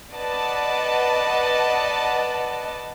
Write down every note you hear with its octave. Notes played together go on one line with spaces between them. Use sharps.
B4 D5 D#5 F#5 A5